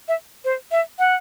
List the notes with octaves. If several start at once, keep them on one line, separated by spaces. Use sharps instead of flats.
E5
C5
E5
F#5